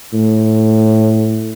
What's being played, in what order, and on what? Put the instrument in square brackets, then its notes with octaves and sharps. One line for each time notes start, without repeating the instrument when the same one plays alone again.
[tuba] A2